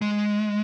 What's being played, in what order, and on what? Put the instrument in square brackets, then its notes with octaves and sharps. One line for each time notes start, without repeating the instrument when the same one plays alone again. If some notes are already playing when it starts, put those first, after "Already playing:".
[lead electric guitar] G#3